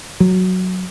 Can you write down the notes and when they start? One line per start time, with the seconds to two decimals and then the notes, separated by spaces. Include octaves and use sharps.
0.20 F#3